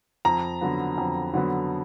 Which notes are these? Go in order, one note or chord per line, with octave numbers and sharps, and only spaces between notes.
F2 A#5
D3 F#3 B3
F2
D3 F#3 B3